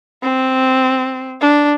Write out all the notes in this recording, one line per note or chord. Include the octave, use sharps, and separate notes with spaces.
C4
D4